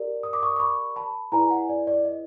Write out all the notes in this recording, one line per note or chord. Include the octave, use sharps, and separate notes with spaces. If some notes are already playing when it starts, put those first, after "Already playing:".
Already playing: G4 A#4 D5
D#6
D6
C#6 D#6
D6
B5 C#6
A5 B5
E4 G#4 B4 D5 G#5 A#5
F#5 G#5
D5
D5
D#5